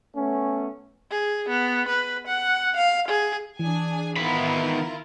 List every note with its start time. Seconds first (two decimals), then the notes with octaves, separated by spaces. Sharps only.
0.16 A3 B3 C#4
1.11 G#4
1.49 B3
1.88 B4
2.27 F#5
2.76 F5
3.08 G#4
3.59 E3 D4 G#4 G#5
4.17 D#3 B3 E4 F4 A#4 B5